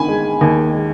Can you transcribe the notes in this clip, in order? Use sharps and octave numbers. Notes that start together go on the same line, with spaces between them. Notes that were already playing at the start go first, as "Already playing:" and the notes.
Already playing: D#3 G#5 B5
G#3
D#2
G#3